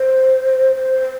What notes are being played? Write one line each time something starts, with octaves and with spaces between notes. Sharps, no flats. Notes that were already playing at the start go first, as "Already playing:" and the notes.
Already playing: C5
C5